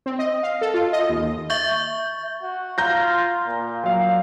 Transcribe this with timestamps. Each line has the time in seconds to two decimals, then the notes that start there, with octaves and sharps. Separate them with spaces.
0.06 C4
0.19 D#5
0.43 F5
0.61 A4
0.74 F4
0.93 D#5
1.09 D#2
1.50 E5 C#6 G6
2.43 F#4
2.78 F4 A#5 G6 A#6
3.47 A#2
3.84 F#3 F5